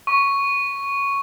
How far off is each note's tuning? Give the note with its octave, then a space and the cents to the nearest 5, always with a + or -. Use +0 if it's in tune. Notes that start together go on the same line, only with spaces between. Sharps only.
C#6 +0